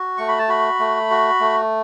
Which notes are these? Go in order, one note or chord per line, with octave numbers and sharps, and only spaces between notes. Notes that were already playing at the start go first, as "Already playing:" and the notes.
Already playing: F#4
A3 C#6
B5
A5
F#4 B5
A3
F#4
A3